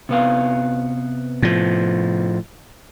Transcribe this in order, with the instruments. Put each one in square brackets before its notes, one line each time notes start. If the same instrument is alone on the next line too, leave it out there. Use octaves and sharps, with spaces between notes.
[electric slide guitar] C3 B3 F5
[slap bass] A2 F3